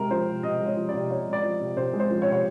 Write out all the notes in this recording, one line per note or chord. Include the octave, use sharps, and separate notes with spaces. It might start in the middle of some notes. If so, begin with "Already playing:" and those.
Already playing: C3 G#3 A#4
F3 C5
C3
C3 D#5
G#3
C#5
F3
D5
C3
C3 C#5
G#3
D5
F3
C3
C3 C5
G#3
C5
F3
C#5
C3
C#5